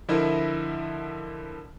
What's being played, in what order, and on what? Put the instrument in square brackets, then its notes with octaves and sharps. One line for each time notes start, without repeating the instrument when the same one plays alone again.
[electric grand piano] D3 F3 E4 A#4 D#5 E5